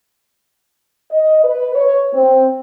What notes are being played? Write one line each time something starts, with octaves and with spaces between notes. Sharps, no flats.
D#5
B4
C#5
C4